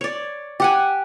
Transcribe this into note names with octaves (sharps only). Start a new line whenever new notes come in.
C#5 D5
G4 F#5 G#5